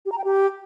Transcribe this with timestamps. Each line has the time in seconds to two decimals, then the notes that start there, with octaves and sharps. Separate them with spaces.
0.06 G4
0.12 A#5
0.18 G5
0.24 G4